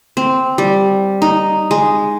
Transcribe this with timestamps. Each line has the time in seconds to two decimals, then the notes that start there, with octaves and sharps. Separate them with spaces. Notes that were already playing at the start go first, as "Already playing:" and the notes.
0.17 C4
0.58 G3
1.22 D#4
1.71 G#3